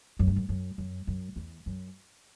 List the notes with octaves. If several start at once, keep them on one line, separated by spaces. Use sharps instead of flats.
F#2
G2
F#2
F#2
F#2
F#2
E2
F#2